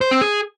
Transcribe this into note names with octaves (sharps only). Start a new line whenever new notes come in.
C5
C4
G#4